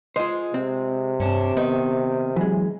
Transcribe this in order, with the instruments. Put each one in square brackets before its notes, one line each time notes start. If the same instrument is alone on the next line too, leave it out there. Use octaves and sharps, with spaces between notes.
[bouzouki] G#3 [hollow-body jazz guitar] F4 C5
[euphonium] C3 [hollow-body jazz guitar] C4
[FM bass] G2 [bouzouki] C#4 D4
[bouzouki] D#3 [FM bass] B3
[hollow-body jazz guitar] E3 G#3 [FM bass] F#3